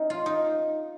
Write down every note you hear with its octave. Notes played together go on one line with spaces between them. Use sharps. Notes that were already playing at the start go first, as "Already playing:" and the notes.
Already playing: C#4 D#4
F4
D#4